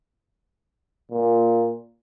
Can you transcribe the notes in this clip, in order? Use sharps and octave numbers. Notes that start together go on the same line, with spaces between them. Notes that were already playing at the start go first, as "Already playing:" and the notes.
A#2